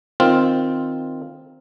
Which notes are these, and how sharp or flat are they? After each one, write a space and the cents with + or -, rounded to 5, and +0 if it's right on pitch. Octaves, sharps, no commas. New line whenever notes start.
D#3 +0 C4 +0 F4 +0